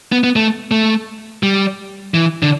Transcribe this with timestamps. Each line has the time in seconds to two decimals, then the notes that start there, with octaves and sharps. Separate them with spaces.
0.12 B3
0.24 B3
0.36 A3
0.71 A3
1.43 G3
2.14 E3
2.43 D3